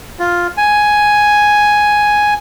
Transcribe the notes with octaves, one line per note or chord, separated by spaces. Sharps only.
F4
G#5